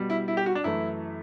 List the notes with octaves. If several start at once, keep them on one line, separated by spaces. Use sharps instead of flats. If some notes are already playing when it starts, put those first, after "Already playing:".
Already playing: B2 G3
E4
E4
G4
F#4
D4
F#2 E3 A3 E4